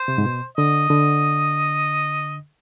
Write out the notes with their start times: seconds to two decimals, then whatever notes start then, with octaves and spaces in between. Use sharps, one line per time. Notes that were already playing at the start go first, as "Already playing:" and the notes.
Already playing: C5
0.08 C3
0.18 G#2
0.26 B2
0.58 D3 D#5
0.90 D3